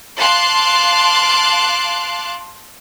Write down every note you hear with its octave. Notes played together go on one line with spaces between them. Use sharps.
F5 A5 C6 D6 F#6